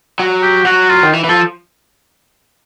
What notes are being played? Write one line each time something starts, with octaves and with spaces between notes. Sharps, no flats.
F#3
G4
F#3 F#4
F4
D#3
E3
E3
F3 A4